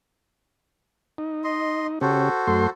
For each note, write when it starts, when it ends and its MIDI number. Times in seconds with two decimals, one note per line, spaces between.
1.18 1.99 63
1.44 1.87 75
1.44 1.87 84
2.01 2.29 49
2.01 2.29 61
2.01 2.70 66
2.01 2.29 67
2.01 2.70 69
2.01 2.70 72
2.47 2.67 42
2.47 2.67 57
2.47 2.67 84